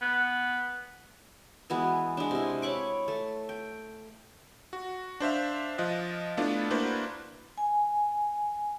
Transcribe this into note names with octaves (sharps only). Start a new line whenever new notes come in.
B3
E3 G#3 B3 F#4
G#3 D4
C3 E4
C#5 B5 C#6 D6
A3
G5
F#4
D4 C5 E5 F5
F3 F4 D#5 F#6
A3 B3 D4 E4 F4
A#3 D4 E4 F#4 B4 C5
G#5